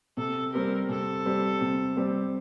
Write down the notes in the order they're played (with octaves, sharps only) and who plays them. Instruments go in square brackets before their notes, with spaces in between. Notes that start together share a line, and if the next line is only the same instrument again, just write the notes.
[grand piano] C3 [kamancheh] A4
[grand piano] G3 C4 G4 [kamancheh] A#4
[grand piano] C3 [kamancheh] A4
[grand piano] G3 C4 G4
C3
G3 C4 G4